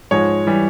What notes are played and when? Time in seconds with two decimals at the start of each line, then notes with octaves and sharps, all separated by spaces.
0.11 G#2 F3 G#3 C#5
0.47 E3 G3